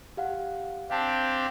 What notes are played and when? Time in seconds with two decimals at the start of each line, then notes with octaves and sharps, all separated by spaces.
0.17 G4 F5 F#5
0.90 C4 D4 G4 F5 A5